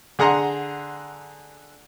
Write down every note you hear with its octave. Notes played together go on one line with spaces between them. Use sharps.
D3 G#4 F#5 A#5 C6